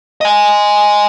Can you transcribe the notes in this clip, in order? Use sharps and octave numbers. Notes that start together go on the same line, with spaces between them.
D#5 G#5